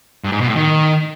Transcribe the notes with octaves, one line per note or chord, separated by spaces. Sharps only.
G2
G#2
B2
A2
D#3